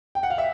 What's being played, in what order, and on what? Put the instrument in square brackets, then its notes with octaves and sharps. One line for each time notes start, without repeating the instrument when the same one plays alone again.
[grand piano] G5
F#5
F5
E5